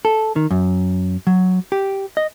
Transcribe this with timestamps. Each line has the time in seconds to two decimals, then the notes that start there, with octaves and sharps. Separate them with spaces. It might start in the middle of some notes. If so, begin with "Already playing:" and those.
0.05 A4
0.36 D#3
0.51 F#2
1.27 F#3
1.72 G4
2.17 D#5